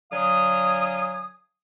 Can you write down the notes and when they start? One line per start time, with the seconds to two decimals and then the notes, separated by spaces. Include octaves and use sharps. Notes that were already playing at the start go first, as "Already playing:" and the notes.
0.12 D3 F#3 F5 G#5 D#6